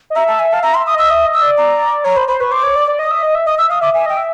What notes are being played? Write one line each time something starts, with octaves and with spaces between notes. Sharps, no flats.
D#5
E5 A#5
A5
G#5
F5 A5
E5 A#5
C6
E5
D#6
D#5 E6
E5 D#6
D#5
E6
D5
A#5
C#5 A#5
C5 B5
C5 B5
B4 C#6
C5 D6
C#5
D5
D5
D#5 D#6
E5
D#5
E5
D#5 D#6
E5 E6
F5 D#6
E5 D6
E5 G#5
D#5 G5
E5